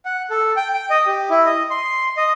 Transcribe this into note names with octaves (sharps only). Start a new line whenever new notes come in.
F#5
A4
G5
G5
D#5
G4
E4
D#5
C6
D#5